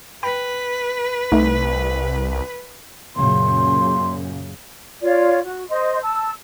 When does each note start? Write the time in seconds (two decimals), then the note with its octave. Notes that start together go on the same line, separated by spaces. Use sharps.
0.23 B4 G5 B5
1.32 C2 A3 D#4
3.16 F#2 A#2 C#3 C6
5.01 F4 C#5 D5
5.44 F#4
5.69 C5 D#5 C6
6.01 A5 E6